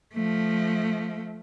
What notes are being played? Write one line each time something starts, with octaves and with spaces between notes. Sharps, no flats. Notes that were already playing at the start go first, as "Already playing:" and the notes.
F3 A3